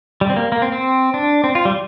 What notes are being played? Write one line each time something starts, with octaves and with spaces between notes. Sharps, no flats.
G3
C4
A#3
A#3
C4
C4
D4
C4
F4
G3